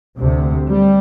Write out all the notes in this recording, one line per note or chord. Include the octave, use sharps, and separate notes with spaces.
D2 C3
G3